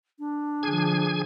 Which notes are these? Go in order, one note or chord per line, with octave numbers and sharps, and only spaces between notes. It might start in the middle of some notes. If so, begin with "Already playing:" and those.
D4
D3 F3 G#4 G#5 G#6